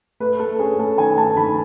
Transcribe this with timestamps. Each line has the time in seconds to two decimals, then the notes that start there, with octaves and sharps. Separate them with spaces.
0.20 A3 B4
0.40 A3 A4
0.59 C#4 G#4
0.79 A3 A4
0.98 D#3 G#5
1.18 A3 A5
1.37 D#3 B5